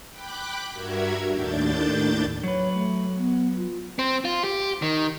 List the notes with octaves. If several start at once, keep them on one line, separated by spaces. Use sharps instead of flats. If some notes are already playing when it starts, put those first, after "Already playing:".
G5 B5 D6 F#6
G2 F#4 A#4 E5 G#6
D#2 A2 D4 G6 A6
F#3 B4 C#5
A3
B3
F4
C4
F4
G4
D#3